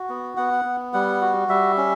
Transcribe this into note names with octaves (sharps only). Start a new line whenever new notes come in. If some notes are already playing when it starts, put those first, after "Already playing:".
Already playing: F#4
B3
B3 F#5
B3
G3 F#5
F#4
G3 E5
C#4